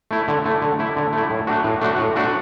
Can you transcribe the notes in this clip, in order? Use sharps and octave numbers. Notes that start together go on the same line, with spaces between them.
A3 E4
D3
A3 E4
D3
A3 E4
D3
A3 E4
A2
A3 D4 F#4
A2
A3 D4 F#4
A2
A3 D4 F#4